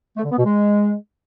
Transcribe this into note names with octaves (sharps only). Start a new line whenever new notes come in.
A3
D3
B3
B2
G#3